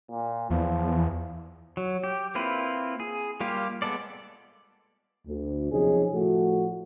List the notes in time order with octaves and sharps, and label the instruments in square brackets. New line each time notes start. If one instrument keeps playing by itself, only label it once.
[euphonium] A#2
[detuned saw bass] E2 [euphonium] F3
[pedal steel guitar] F#3
G4
A#3 C4 E4 F4 B4
G#4
G3 A#3 F4 G4
G#3 B3 A4 D5
[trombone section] D2
B1 C3 F3 C#4 D#4 G#4
A2 F3 A3 F#4